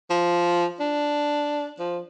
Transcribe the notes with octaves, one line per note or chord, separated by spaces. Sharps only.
F3
D4
F3